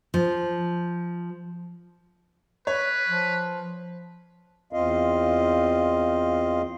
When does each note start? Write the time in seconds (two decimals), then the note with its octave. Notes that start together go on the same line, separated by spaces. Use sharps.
0.14 F3
2.67 B4 C#5
3.09 F3
4.73 E2 C4 F4 D#5 F5